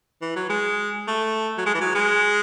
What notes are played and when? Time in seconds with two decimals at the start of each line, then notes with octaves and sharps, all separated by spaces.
0.22 E3
0.36 F#3
0.50 G#3
1.08 A3
1.57 F#3
1.66 G#3
1.74 E3
1.81 F#3
1.95 G#3